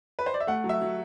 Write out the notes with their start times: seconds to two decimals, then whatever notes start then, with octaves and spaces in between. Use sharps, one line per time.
0.19 B4
0.26 C5
0.34 D5
0.40 E5
0.47 A3 F#5
0.64 F#3
0.69 E5
0.82 F#3